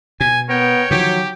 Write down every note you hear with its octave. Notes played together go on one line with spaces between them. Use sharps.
B2 G#5
B3 A#4 C#5 G5
D3 D#3 F3 F#3 G4